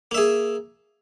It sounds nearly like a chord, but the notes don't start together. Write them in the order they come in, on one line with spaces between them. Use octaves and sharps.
A#3 E5 G#4